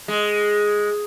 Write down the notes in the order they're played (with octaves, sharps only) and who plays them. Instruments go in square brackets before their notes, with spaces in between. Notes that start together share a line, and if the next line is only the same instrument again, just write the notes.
[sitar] G#3